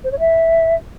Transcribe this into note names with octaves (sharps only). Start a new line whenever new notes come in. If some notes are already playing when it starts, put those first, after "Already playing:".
C5
C#5
E5